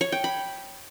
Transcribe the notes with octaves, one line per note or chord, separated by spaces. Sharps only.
C#5
G5
B5